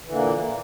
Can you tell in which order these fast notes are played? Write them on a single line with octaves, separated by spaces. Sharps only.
E3 D3 A#2 A#3